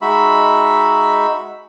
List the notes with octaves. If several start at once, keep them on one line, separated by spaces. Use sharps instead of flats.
G#3 D#4 F#4 E5 B5